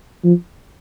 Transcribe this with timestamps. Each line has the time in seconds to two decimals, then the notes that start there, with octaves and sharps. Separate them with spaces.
0.24 F3